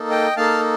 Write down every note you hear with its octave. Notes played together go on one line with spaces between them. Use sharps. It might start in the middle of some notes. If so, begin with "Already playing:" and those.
Already playing: A#3 D#4 A4
D#5 G5
A#3 D#4 A4 F5 A5